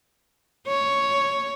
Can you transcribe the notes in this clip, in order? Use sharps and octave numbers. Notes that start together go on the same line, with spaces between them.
C#5